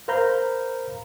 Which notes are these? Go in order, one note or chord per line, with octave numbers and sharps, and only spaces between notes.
A#4 C5 F5 A#5 B5 G6